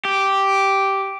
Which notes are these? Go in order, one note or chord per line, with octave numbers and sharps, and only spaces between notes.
G4